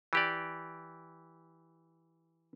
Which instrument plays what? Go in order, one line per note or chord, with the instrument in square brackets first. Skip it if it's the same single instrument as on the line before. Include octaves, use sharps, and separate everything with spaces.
[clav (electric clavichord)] E3 G4 D5